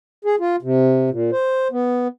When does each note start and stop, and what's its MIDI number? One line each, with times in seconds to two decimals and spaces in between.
0.25 0.36 68
0.40 0.56 65
0.62 1.10 48
1.10 1.31 46
1.32 1.68 72
1.71 2.08 59